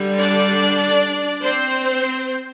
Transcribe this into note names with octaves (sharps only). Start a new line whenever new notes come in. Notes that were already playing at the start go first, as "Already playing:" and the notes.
Already playing: D3 G3
D4 D5
C4 C5